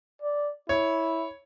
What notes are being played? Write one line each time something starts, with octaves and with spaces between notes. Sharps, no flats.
D5
E4 C#5